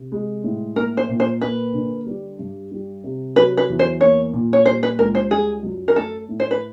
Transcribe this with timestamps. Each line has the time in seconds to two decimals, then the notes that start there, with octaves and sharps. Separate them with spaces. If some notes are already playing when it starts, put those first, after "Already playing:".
Already playing: C3
0.12 G#3
0.44 A2
0.76 A#3 A#4
0.97 C5
1.09 A#2
1.20 C5
1.41 A#3 B4
1.74 D3
2.06 G3
2.39 G2
2.72 G3
3.04 C3
3.36 F#3 B4
3.57 B4
3.69 E2
3.79 C5
4.01 A#3 C#5
4.33 A#2
4.53 C#5
4.66 G3 C5
4.83 B4
4.99 C#2 A#4
5.15 C5
5.31 G3 G#4
5.63 F#2
5.88 A#4
5.96 A3 A4
6.29 A2
6.40 C5
6.51 B4